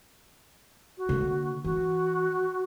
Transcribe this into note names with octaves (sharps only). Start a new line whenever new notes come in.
F#4
D3 A#3
E3 F#4